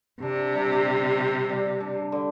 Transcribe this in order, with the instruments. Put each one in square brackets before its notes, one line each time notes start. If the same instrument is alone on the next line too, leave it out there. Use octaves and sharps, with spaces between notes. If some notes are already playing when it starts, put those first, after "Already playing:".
[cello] C3 [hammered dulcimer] D4
[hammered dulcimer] G3
G3
G4
G3
D4
D3